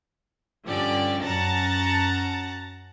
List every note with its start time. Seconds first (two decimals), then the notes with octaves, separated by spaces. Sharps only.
0.66 G2 D3 F3 C#4 G4 D5
1.23 F#2 C#4 F#5 A5 A#5 A6